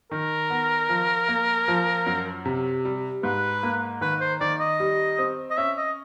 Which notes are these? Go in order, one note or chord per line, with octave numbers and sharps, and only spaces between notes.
D#3 A#4
B3
F3
A#3
F3
F#2
C3
G3
G#2 B4
A#3
D#3 B4
C5
D#3 D5
D#5
G3
C4
D#5
C#4 E5
D#5